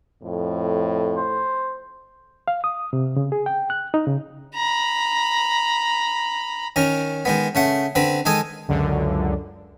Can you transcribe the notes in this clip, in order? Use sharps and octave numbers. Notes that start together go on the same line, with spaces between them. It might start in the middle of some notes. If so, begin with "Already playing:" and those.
F2 A2
C5
F5
D#6
C3
C#3
G#4
G5
F#6
D#4
C#3
A#5 B5
D#3 C#4 A#4
D#3 G#3 B3
C#3 A3 F#5
D3 C4 B4
D#3 G#3 A4 G#5 D#6
C#2 F#2 D3